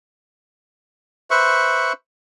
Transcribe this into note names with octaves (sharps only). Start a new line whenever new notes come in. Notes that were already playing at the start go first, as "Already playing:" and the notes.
B4 C5 E5 C#6